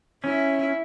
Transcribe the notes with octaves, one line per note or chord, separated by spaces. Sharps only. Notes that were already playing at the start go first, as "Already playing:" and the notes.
C#4 E4